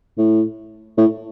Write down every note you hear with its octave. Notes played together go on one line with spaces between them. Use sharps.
A2
A2